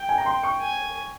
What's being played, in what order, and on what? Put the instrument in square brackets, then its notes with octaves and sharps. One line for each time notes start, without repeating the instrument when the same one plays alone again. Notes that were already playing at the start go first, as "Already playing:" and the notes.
Already playing: [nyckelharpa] G5
[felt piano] G#5
A#5
C6
C#6
[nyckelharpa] G#5